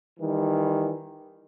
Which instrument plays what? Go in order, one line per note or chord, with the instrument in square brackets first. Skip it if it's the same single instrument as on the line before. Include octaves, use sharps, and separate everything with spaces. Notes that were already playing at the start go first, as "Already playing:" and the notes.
[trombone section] D#3 E3 G3